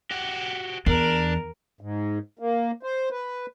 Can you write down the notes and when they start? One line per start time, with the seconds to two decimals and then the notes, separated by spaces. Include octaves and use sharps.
0.11 F#4 G4
0.86 E2 D4 A#4
1.81 G#2
2.39 A#3
2.83 C5
3.11 B4